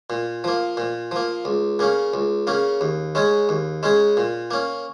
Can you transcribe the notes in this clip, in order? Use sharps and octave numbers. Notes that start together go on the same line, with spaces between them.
A#2
F3 A#3
A#2
F3 A#3
C#2
C#3 A#3 C#4
C#2
C#3 A#3 C#4
D#2
C#3 G#3 C#4 G#4
D#2
C#3 G#3 C#4 G#4
A#2
A#3 C#4